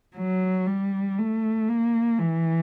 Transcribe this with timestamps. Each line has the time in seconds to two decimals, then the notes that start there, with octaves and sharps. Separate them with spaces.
0.16 F#3
0.66 G3
1.18 A3
1.69 A#3
2.19 E3